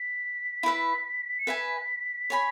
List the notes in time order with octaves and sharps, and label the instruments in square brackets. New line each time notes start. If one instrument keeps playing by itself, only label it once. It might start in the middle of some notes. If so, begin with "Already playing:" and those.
Already playing: [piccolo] B6
[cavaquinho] E4 B4 E5
[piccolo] C#7
[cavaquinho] B4 E5 G#5 [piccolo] B6
[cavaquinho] C#5 G#5 B5